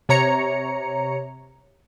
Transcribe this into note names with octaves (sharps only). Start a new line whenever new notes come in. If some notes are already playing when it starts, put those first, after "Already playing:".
C3 C#5 A#5 C#7